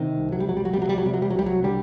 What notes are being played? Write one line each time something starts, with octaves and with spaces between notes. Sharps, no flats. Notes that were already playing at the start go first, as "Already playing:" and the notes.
Already playing: C3 D#3
C2
F#3
G3
C2 F#3
G3
F#3
G3
C3
F#3
G3
F#3
C3 G3
F#3
G3
F#3
C2 G3
F#3
D3 G3